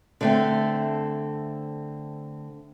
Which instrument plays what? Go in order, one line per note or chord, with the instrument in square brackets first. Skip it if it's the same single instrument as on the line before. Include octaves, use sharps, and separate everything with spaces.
[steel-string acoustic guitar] D3 A3 C4